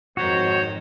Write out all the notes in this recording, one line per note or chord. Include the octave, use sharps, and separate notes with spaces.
F2 G#2 D#3 F#4 C5 C#5